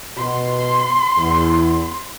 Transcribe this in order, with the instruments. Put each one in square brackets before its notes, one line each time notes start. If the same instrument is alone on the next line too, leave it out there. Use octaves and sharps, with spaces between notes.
[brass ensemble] B2 [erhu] C6
[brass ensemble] E2